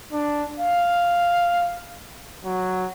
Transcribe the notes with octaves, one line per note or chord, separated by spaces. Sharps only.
D4
F5
F#3